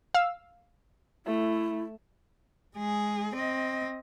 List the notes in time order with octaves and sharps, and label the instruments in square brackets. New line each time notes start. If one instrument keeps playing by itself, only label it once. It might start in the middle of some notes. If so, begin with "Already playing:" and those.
[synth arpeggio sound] F5 E6
[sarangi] A3 [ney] E4
[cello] G#3 G#4
C4 D#5